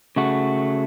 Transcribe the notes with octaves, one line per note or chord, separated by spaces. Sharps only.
C#3 A3 F#4